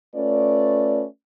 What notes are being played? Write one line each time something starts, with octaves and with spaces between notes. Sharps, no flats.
A3 C#4 F4 B4 D5